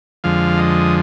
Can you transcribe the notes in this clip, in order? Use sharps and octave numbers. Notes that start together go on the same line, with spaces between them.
F2 D3 F3 G#3 F5
D#5